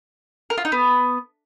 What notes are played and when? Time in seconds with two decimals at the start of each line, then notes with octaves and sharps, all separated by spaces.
0.50 A#4
0.57 F4
0.65 D#4
0.72 B3